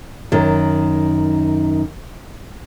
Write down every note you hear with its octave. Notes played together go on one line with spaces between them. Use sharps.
F#2 D#3